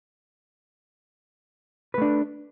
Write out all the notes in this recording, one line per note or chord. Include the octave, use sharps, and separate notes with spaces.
A3 D4 B4